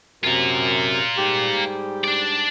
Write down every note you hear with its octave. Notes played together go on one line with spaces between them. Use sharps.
F#2 C3 F4 A#4
G#2 G3 G4
D4 D5